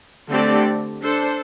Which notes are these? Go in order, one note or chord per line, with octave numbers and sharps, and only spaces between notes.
D3 A3 C4 G4 D5
D4 A4 C5